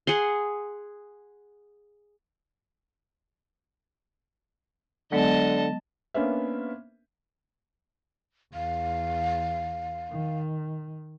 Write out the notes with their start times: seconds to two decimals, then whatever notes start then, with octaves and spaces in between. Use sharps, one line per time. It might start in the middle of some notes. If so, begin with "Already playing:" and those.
0.07 G#4 F#5 C6
5.12 D3 F#3 G#3 B3 D#5 A5
6.14 A#3 B3 C#4 D4 C5 E5
8.54 E2 F5
10.10 D#3